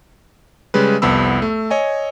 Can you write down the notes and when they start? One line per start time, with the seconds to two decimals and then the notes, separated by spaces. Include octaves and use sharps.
0.74 C#3 G3 G#3 B4
1.02 C2 F2 B3 B5 E6
1.42 A3
1.70 C#5 D#5 G#5